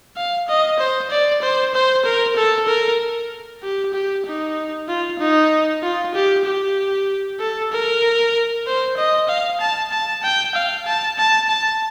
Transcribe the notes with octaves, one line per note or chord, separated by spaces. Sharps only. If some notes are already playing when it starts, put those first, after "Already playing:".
F5
D#5
C5
D5
C5
C5
A#4
A4
A#4
G4
G4
D#4
F4
D#4
F4
G4
G4
A4
A#4
C5
D#5
F5
A5
A5
G5
F5
A5
A5
A5